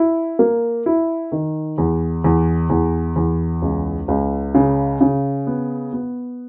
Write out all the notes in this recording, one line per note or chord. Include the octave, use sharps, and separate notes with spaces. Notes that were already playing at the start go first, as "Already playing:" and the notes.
Already playing: E4
A#3
E4
D#3
E2
E2
E2
E2
C#2
C#2
C#3
C#3
B3
B3